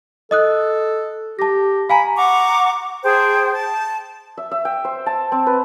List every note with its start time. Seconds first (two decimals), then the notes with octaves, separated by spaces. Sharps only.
0.31 A4 D#5 D#6 F#6
1.39 G4 A5 A#6
1.90 F5 G#5 A#5 B5
2.17 F#5 A#5 C#6 D6
3.04 G#4 C5 G5 A5
3.53 A5
4.37 E5
4.51 E5
4.65 G5
4.85 C5
5.06 A5
5.32 C4
5.47 B4